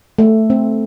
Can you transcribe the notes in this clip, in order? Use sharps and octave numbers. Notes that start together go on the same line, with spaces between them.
A3
C4